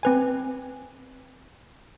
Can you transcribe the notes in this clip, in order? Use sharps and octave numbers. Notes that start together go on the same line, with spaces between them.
C4 B4 G#5